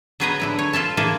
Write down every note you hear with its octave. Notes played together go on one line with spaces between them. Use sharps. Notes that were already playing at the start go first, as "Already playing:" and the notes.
F#3 B3 G#4 B4 D#5 A#5
D3 E4 B4
C#5
F4 A4 E5 A5
E3 A#3 E4 G#4 A4